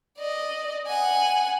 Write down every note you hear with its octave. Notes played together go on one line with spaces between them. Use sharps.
D5 D#5
F#5 G#5